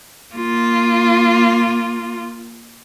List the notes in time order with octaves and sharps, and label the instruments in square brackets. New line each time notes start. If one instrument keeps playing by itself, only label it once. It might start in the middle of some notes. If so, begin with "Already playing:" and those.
[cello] A#3 F4